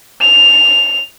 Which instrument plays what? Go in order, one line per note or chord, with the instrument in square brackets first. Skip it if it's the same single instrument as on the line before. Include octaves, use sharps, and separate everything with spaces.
[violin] F7